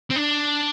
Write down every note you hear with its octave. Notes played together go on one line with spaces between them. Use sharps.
C4
D4